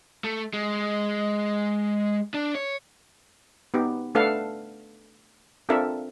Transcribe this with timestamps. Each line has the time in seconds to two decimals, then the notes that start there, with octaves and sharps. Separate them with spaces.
0.24 A3
0.54 G#3
2.34 D4
2.55 C#5
3.74 B3 D#4 G4
4.15 A3 D4 A4 B4 F5 F#5
5.69 C4 D4 F4 A4 A#4 E5